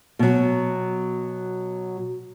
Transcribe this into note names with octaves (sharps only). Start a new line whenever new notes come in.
B2 F#3